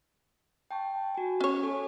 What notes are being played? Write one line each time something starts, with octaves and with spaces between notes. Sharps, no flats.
G5 A5 C#6
F#4 G#5
C#4 C#5
A4 G#5